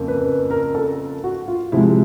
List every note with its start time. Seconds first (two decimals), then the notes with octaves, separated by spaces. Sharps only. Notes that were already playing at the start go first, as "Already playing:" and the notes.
Already playing: F2 C#3 A#3
0.08 B4
0.26 B4
0.51 A#4
0.75 A4
1.24 F#4
1.48 F4
1.72 C3 F3 G#3 E4